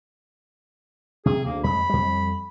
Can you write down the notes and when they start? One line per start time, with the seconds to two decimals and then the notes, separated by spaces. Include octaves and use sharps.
1.26 C3 G#4
1.45 D2 A#3
1.64 F2 G#3 B5
1.89 F2 G3